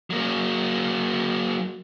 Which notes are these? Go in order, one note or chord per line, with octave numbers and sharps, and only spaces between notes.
F#3 A#3